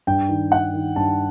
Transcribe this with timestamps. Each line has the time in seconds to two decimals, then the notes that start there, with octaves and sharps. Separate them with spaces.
0.07 G2 G5
0.29 D#3
0.52 G2 F#5
0.74 D#3
0.96 G2 A5